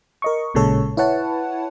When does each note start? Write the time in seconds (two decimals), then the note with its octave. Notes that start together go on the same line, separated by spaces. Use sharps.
0.22 A#4 D#5 C#6
0.54 A1 A#2 C#3 G#3 A4 C#5
0.97 E4 B4 C#5 F#5 A5